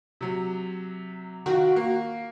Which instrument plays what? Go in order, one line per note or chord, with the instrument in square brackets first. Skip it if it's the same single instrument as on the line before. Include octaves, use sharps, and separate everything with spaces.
[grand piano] C3 F#3
[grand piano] D#3 F4 [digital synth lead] F#4
[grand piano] A#3